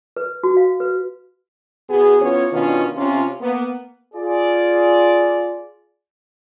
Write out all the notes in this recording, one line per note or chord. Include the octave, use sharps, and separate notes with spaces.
B4
F#4
F5
B4
E2 B3 F#4 G#4
E3 B3 C#4 F4 C#5
B2 D#3 B3 C#4 D4 F4
C3 C#4 F4
A#3 B3
F4 G#4 D5